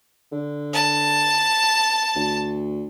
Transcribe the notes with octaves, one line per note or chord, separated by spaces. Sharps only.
D3
A5
D2